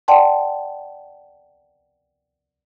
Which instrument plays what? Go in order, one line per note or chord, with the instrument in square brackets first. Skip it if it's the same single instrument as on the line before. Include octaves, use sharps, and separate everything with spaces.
[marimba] D5 F#5 G5 A5 C6